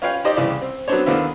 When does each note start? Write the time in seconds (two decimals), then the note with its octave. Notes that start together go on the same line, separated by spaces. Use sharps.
0.02 C#4 F4 B4 C#5 F5 G5
0.24 D#4 G4 C5 D5 D#5
0.36 C2 C#3 E3 E4 D5
0.62 C4
0.88 F#3 B3 C4 D4 C5 C#5
1.06 D#2 D3 A#3 B3 D#4 E4